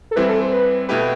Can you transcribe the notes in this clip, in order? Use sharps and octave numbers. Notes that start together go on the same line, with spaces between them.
A4
E3 G3 C4 E4 B4
A4
C5
B4
B2 A3 E4 G4 B4